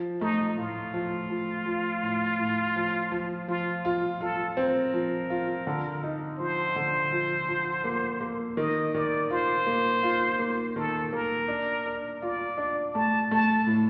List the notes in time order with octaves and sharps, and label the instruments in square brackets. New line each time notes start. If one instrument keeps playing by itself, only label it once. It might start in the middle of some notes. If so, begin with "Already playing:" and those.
Already playing: [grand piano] F3
[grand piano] A3 [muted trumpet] D#4
[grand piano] A2 [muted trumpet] F4
[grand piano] F3
F3
F3
A2
A2
F3
F3
[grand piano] F3 [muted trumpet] F4
[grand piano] F4
[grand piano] F4 [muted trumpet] A4
[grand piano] C4 [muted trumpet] A#4
[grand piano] F3
F4
D3
D#4
[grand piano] F3 [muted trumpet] C5
[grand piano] D3
F3
F3
A#3
A#3
[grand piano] D#3 [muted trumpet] D#5
[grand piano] D#3 [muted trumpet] D5
[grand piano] F4 [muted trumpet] C5
[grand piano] A#3
F4
A#3
[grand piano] D#3 [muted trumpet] A4
[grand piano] A#3 [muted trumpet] A#4
[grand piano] D4
D4
[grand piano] F4 [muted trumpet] D5
[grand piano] D4
[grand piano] A3 [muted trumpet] A5
[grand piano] A3 [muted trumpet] A5
[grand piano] A2